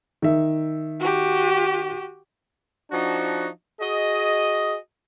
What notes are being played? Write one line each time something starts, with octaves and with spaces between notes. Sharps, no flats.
D#3 E5
F#4 G4
F3 D4 D#4 F#4
F#4 G#4 D#5